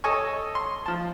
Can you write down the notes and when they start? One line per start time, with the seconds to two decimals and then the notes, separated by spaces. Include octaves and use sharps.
0.04 A4 C#5 D#5 G#5 C#6
0.55 C6
0.86 F3 A5